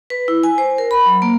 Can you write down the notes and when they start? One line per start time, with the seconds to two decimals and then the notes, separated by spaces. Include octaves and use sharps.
0.10 B4
0.28 E4
0.43 G#5
0.58 C5
0.78 A#4
0.91 B5
1.06 F#3
1.22 A#3